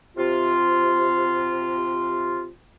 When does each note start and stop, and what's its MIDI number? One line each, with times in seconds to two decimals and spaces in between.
0.17 2.47 48
0.17 2.47 65